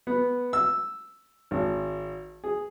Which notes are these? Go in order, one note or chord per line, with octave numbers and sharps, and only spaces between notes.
B3
E6
G#1
G#4